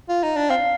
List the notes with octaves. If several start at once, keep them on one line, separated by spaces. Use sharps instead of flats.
F4
D#4
D4
C4 F5